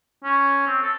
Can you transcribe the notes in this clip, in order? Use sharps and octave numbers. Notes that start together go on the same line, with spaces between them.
C#4
C4
A4